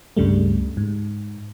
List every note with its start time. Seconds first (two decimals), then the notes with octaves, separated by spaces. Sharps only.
0.17 C#2 G2 C#3 G3 A3
0.77 G#2